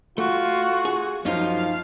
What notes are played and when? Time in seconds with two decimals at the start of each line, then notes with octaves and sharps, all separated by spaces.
0.18 A3 F4 F#4
0.85 G#4
1.25 F#2 F3 D#4 F4 F5